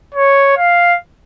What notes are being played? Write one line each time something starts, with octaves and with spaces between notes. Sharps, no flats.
C#5
F5